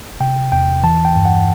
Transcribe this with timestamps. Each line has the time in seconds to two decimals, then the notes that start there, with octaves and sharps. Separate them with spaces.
0.20 C3 G5
0.52 E2 G5
0.83 E3 A5
1.05 G5
1.15 G2
1.25 F#5